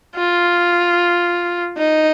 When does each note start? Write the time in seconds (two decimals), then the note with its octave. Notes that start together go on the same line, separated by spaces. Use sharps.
0.16 F4
1.77 D#4